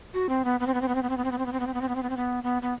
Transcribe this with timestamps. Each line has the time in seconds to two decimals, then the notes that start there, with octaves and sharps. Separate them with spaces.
0.14 F#4
0.29 C4
0.44 B3
0.60 B3
0.67 C4
0.74 B3
0.81 C4
0.88 B3
0.95 C4
1.03 B3
1.09 C4
1.17 B3
1.24 C4
1.31 B3
1.38 C4
1.46 B3
1.52 C4
1.60 B3
1.67 C4
1.74 B3
1.81 C4
1.88 B3
1.95 C4
2.03 B3
2.10 C4
2.17 B3
2.43 B3
2.62 B3